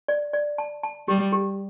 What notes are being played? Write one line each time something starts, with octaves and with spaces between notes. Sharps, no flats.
D5
D5
A5
A5
G3 G4
G4